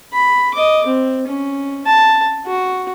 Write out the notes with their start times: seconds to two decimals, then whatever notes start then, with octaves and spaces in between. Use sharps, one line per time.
0.13 B5
0.54 D#5 D6
0.87 C4
1.27 C#4
1.86 A5
2.47 F#4